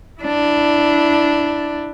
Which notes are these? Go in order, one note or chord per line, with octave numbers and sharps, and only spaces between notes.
D4 E4